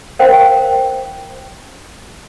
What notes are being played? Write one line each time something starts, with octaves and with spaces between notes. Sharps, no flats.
A#4 C5 F5 G5